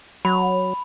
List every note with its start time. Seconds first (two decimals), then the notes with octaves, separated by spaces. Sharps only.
0.25 F#3 B5